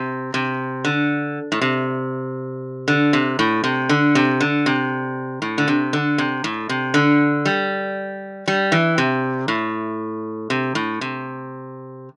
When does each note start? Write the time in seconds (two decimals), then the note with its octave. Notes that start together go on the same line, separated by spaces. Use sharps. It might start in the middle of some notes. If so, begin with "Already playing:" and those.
Already playing: C3
0.34 C3
0.85 D3
1.52 A2
1.61 C3
2.88 D3
3.13 C3
3.39 A2
3.64 C3
3.89 D3
4.15 C3
4.40 D3
4.66 C3
5.42 A2
5.58 D3
5.68 C3
5.93 D3
6.18 C3
6.44 A2
6.69 C3
6.94 D3
7.45 G3
8.48 G3
8.72 E3
8.98 C3
9.48 A2
10.50 C3
10.75 A2
11.01 C3